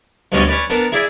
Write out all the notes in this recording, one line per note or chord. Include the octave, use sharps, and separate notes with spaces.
D2 G2 B2 C#4 D5 D#5
C#4 B4 D5
B3 D4 A#4 A5
E4 G#4 D5 E5